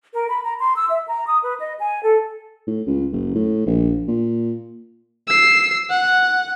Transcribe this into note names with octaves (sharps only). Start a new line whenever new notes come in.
A#4
B5
A#5
C6
E6
E5
A#5
D#6
B4
D#5
G#5
A4
A2
C#2
F#1
A2
A#1
A#2
E6 C7
F#5